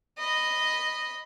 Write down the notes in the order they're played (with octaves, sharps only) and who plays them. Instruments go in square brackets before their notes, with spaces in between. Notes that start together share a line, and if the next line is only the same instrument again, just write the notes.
[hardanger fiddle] D#5 B5